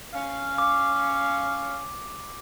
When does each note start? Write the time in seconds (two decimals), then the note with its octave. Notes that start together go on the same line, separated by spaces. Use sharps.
0.14 C#4 F5
0.58 D6